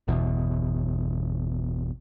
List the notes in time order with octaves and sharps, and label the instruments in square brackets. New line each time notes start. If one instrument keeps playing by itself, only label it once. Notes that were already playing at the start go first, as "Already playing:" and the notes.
[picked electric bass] G1 E2 B2